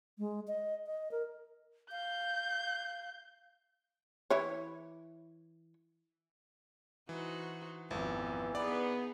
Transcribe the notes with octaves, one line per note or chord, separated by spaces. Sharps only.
G#3
D#5
D#5
A#4
F5 G6
E3 E4 C#5
E3 D#4 F#4 C5
G#1 F2 E3 B3
B3 D#4 G#4 B4 D5